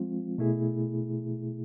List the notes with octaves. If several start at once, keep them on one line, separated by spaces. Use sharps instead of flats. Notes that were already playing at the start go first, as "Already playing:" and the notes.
Already playing: F3 G#3 C4 F4
B2 A3 E4 G#4